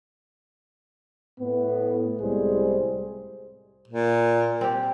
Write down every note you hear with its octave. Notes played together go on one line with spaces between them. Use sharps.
A2 B3
C2 A2 G3 G#3 G#4 C5
A#2
C4 G4